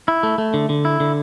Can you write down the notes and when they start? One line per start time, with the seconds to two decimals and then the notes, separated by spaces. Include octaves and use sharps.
0.08 E4
0.23 A3
0.38 A3
0.54 D3
0.69 D3
0.85 E4
1.00 D3